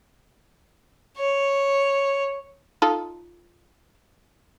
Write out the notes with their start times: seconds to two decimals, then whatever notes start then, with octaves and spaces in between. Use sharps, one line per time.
1.18 C#5
2.82 D#4 F4 A4